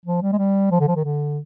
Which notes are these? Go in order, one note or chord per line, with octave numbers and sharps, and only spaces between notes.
F3
G3
G#3
G3
F3
D3
F3
D#3
D3